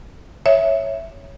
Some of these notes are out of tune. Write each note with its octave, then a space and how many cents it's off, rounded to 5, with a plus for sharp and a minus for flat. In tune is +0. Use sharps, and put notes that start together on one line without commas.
C#5 +0 E5 +0